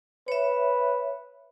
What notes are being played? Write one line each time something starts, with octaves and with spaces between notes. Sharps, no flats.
B4 C#5 E5